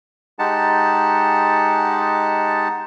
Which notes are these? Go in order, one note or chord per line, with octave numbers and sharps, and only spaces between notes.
G#3 D#4 G4 F#5 A5